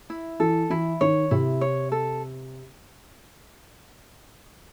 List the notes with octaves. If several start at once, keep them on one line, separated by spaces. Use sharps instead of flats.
E4
E3 A4
E3 E4
D#3 C#5
C3 E4
C#5
A4